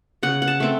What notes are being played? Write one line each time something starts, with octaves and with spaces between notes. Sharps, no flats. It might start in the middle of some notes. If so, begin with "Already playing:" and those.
C#3 F#5
F#5
A5
A3 C4